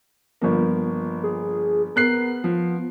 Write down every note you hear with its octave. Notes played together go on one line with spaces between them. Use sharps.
G1 F3 A#3
G#4
B3 A#4 F#6 C7
F3